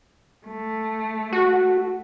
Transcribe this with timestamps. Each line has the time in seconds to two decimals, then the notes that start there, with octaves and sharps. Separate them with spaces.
0.47 A3
1.33 F#4